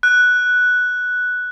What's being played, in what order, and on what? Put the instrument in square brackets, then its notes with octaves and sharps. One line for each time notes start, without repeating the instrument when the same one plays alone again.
[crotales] F#6